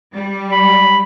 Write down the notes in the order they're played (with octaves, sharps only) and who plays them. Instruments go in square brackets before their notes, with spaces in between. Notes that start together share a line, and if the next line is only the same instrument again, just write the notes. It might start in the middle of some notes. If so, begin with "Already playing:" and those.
[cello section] G3
[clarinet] B5